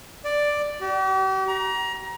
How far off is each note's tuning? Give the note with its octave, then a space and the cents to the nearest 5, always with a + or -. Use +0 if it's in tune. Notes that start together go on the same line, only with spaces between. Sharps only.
D5 +5
G4 -45
A#5 +25